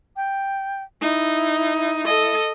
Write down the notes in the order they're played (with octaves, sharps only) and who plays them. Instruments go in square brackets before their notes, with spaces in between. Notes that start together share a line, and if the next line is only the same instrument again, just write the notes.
[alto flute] G5
[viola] D#4 [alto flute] E4
[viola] A4 D#5